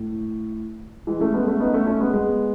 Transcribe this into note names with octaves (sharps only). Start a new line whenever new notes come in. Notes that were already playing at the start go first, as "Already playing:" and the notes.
Already playing: A2
E3 G#3
A3 C#4
G#3 B3
A3 C#4
B3 D#4
A3 C#4
A3 C#4
G#3 B3
G#3 B3